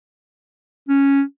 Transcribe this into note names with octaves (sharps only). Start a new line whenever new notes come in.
C#4